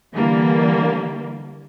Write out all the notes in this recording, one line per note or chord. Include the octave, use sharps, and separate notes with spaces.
D3 E3 G3 A#3